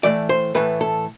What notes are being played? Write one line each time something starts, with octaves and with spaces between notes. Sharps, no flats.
A2 E3 A3 D5
C5
A2 E3 A3 B4
A4